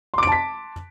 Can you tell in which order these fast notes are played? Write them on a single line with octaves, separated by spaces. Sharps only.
C6 D6 D7 A5 B6